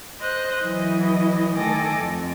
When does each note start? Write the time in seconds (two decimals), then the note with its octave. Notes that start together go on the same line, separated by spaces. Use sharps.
0.19 C5 D#5 F#6
0.62 E3 F#3 E4 D#5
1.54 D#3 A3 A4 G#5 D6 A#6
1.99 F2